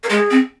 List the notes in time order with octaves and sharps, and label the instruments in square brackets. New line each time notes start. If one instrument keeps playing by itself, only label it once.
[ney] A#4
[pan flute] G#3 [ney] G#4
[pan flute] C4